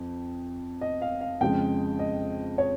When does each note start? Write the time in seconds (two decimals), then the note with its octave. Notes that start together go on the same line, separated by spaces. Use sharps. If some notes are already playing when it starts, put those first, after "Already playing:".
Already playing: F2
0.81 D#5
1.02 F5
1.21 F5
1.41 F2 C#3 G#3 G5
1.99 D#5
2.58 C#5